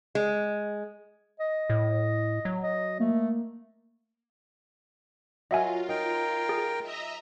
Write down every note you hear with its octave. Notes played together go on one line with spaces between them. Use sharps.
G#3
D#5
A2
F#3
D#5
A3 A#3
F#3 F4 F#4 A#4 D#5 E5 G#5
D#4 A#4 G5
G#4
D#5 E5 A#5